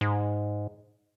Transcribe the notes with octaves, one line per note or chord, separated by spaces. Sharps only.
G#2